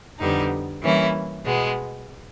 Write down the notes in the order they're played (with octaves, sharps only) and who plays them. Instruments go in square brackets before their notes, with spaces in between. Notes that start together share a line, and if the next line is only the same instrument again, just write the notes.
[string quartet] F2 D3 G3 B3 D#4
E3 G3 A#3 C#4 E4
B2 G#3 B3